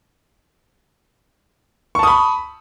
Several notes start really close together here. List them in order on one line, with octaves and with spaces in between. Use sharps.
C#6 A5 D#6 B5